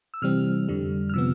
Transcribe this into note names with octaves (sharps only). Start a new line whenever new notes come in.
E6
C3 E3 G3 C4 F6
F2 D3 G3
F6
C3 F3 B3 E6